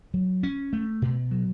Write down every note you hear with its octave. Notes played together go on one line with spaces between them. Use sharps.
F#3
C#4
A3
B2
F#3